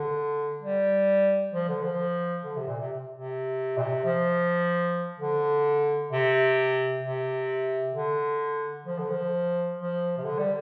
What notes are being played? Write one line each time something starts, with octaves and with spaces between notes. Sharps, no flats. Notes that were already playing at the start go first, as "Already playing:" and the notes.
Already playing: D3
G3
F3
D3
F3
D3
C3
A#2
C3
C3
A#2
C3
F3
D3
C3
C3
D3
F3
D3
F3
F3
C3
D3
G3